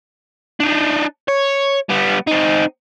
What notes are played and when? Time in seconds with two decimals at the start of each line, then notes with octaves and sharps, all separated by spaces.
0.60 D4 D#4
1.28 C#5
1.89 G3 B3
2.27 C4 D#4